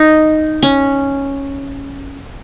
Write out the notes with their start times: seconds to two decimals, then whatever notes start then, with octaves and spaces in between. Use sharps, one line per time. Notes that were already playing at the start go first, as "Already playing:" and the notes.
Already playing: D#4
0.62 C#4